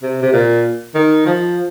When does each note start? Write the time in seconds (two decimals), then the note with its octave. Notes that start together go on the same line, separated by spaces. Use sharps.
0.02 C3
0.22 C3
0.33 A#2
0.95 D#3
1.26 F3